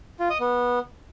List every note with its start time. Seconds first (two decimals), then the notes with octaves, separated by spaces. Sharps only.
0.20 F4
0.30 D#5
0.40 B3